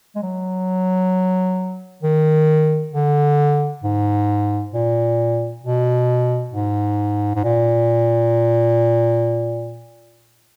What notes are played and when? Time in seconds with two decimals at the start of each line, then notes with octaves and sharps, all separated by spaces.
0.16 G#3
0.23 F#3
2.03 D#3
2.93 D3
3.83 G#2
4.74 A#2
5.63 B2
6.54 G#2
7.35 G#2
7.44 A#2